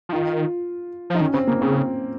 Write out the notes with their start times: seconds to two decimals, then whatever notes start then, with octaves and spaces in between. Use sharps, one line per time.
0.09 F3
0.13 D#3 F4
1.10 F3 D#4
1.21 D#3 C#4
1.34 C#3 C4
1.47 C#3 A#3
1.61 C#3 C4